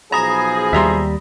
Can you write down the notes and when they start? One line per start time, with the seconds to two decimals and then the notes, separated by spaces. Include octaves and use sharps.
0.12 B1 F3 G#4 A#5 B5 D#6 A#6
0.73 D#2 G3 E5 A#5 C6